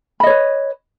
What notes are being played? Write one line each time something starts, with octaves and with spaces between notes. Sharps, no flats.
B4 C#5 D#5 B5